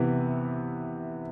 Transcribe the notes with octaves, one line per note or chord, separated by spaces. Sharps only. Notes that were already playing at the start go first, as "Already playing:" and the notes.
Already playing: C3 E3 B3